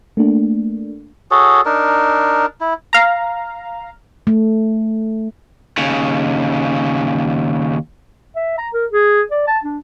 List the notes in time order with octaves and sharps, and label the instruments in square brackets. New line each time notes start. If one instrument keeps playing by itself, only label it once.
[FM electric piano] A3 A#3 D4
[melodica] F#4 G#4 A4 C#5
D4 D#4 A#4
E4
[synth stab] F5 A#5
[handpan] A3
[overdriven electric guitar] D#2 C#3
[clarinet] E5
A#5
A#4
G#4
D5
A5
D4